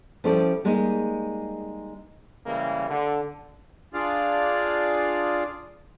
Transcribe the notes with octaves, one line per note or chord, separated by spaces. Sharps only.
F3 G3 C#4 E4 A4 D5
G3 G#3 A#3 D#4 G#4
C#3 E3 G3 G#3 A#3
D3
D4 F4 G#4 D5 F5